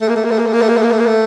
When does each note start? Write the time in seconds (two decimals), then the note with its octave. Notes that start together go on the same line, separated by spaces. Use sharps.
0.01 A3
0.09 A#3
0.16 A3
0.24 A#3
0.31 A3
0.39 A#3
0.47 A3
0.53 A#3
0.62 A3
0.69 A#3
0.77 A3
0.83 A#3
0.92 A3
0.99 A#3
1.07 A3